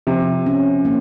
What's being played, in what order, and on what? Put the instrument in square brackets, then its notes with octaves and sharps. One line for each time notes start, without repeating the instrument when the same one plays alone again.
[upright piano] C3 [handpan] F3
[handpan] C#4
A#3